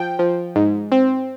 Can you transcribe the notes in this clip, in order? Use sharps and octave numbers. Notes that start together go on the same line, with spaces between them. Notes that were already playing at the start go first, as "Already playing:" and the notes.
Already playing: F3 G5
F3
G#2
C4